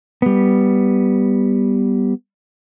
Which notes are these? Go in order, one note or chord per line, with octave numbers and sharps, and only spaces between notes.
G3 B3